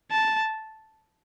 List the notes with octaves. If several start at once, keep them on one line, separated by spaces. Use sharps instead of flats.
A5